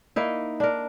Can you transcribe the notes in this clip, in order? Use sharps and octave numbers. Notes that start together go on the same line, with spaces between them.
A#3 D#4 E4
D4 A#4